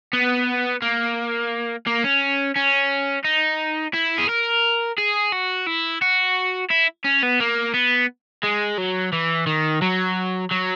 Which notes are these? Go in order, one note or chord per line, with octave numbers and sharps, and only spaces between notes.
B3
A#3
A#3
C#4
C#4
D#4
E4
G#4
A#4
G#4
F#4
E4
F#4
E4
C#4
B3
A#3
B3
G#3
F#3
E3
D#3
F#3
F#3